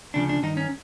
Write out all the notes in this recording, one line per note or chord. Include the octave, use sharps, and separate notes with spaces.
D2 C#3 F3 D4
D4
G2 D#3 D#4
C#4